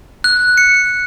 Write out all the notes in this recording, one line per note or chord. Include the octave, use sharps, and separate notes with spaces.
F#6
C#7